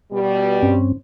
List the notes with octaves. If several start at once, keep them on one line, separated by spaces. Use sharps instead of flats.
B2 G3
G2 C4 C#4